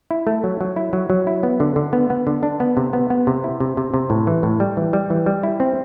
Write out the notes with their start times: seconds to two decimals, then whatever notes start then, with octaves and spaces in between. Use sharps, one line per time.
0.11 E4
0.27 A3
0.44 F#3
0.61 F#3
0.76 E4
0.93 F#3
1.10 F#3
1.27 E4
1.43 B3
1.60 D3
1.76 D3
1.93 B3
2.10 B3
2.27 D3
2.43 D4
2.60 B3
2.77 C3
2.93 B3
3.10 B3
3.27 C3
3.44 E4
3.60 C3
3.77 C3
3.94 C3
4.10 A2
4.27 E3
4.43 A2
4.60 G3
4.77 E3
4.93 G3
5.10 E3
5.26 G3
5.43 E4
5.60 C4